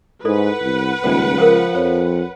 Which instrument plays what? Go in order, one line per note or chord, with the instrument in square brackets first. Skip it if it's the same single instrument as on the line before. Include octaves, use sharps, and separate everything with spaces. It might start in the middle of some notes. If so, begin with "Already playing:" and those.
[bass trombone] G#2 [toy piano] E4 A4 D5 [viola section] B4 F#5
[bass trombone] C2
[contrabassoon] D#1 [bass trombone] C#2 [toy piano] C5 D5
[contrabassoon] F3 [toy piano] A#4 G5
[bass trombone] F2 [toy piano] C#5